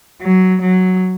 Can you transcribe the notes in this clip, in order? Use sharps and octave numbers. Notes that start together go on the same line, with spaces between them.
F#3
F#3